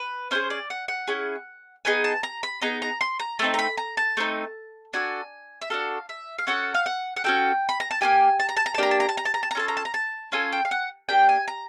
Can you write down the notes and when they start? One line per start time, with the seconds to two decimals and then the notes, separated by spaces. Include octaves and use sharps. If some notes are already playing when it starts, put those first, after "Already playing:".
Already playing: B4
0.31 C#4 E4 G#4 C5
0.50 D5
0.70 F#5
0.88 F#5
1.08 C#4 E4 G#4
1.85 B3 D#4 G#4 G#5
2.04 A5
2.23 A#5
2.43 B5
2.62 B3 D#4 G#4 A#5
2.82 A#5
3.01 C6
3.20 A#5
3.39 A3 C4 D#4 A5
3.54 A#5
3.59 B5
3.77 A#5
3.97 A5
4.17 A3 C4 D#4
4.93 D4 F#4 A4 G#5
5.62 E5
5.70 D4 F#4 A4 F5
6.09 E5
6.38 F5
6.47 C#4 F#4 A4 F#5
6.75 F5
6.86 F#5
7.16 F#5
7.24 C#4 F#4 A4 G5
7.69 B5
7.80 A#5
7.91 A5
8.01 A#3 D4 G4 G#5
8.40 A5
8.49 A#5
8.57 A5
8.66 A#5
8.74 A5
8.78 A#3 D4 G4 A#5
8.91 A5
9.00 A#5
9.09 A5
9.17 A#5
9.25 A5
9.34 A#5
9.43 A5
9.51 A#5
9.55 C#4 F4 A4 A5
9.68 A#5
9.77 A5
9.85 A#5
9.94 A5
10.32 C#4 F4 A4 G#5
10.52 G5
10.65 F5
10.71 F#5
11.09 A#3 D4 G4 G5
11.29 G#5
11.48 A#5